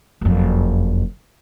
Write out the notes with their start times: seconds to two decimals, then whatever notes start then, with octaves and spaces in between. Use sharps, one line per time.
0.21 F#1 F2